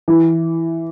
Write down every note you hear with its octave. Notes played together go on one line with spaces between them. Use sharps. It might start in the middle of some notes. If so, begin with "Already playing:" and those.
E3